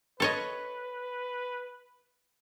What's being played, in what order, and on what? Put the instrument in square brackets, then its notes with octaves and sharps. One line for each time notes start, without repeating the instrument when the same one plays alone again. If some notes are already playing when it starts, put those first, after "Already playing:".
[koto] A4 C#5 D#5 [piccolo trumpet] B4